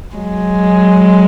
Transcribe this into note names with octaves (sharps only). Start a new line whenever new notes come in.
F#3 G#3